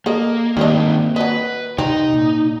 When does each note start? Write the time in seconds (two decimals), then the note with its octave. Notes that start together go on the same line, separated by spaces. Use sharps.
0.06 A#3 G#4 A4 D#5
0.57 D#3 G3 A#3 C4 D4 D#5
1.16 F#3 B4 D#5
1.78 C3 C4 D#4
2.13 A#2